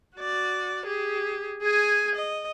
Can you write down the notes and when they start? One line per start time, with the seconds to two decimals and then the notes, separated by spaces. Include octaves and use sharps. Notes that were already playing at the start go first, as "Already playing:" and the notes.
0.17 F#4 D5
0.85 G4 G#4
1.62 G#4 G#5
2.15 D#5